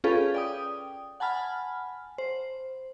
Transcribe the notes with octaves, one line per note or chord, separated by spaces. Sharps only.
C#4 F4 G#4 A4 B4 F5
D5 G5 D#6
F#5 G#5 A5 B5 F6
C5